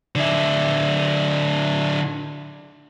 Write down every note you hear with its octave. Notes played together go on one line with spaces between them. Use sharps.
D3 E4